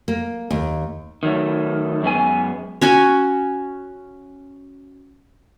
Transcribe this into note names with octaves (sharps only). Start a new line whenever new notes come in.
A#3
D#2
D#3 F#3 A3
F#2 G#3 B3 G#5
C#4 F#4 G#5